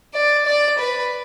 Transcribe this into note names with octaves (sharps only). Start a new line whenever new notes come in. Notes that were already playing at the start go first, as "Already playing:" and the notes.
D5
D5
B4